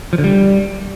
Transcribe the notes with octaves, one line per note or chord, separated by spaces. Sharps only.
F3
D3
G3